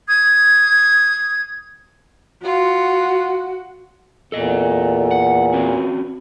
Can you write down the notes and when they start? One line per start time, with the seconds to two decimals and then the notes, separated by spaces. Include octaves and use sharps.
0.07 D#6 G#6
2.44 F4 F#4
4.32 E2 A#2 A4 D#5
5.11 F#5
5.54 C4 C#4 F#4